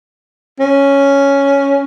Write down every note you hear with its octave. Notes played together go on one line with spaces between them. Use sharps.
C#4